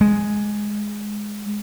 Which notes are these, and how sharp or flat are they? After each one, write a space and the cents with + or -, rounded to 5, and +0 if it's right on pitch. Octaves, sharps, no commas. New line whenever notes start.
G#3 +5